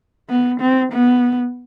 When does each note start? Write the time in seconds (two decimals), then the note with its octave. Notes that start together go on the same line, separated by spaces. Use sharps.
0.30 B3
0.61 C4
0.93 B3